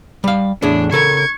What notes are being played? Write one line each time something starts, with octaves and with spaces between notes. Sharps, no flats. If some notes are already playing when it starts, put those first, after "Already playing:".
G3 F5
E2 A2 D4 G#4
C#3 A4 A#4 C#6 G#6